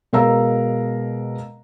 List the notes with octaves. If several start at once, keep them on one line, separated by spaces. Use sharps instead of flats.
B2 G#3 A#4 F5 A#5 E6